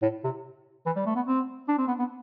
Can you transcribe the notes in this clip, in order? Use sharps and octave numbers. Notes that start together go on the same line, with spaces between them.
A2
C3
E3
G3
A3
B3
C4
D4
C4
B3
B3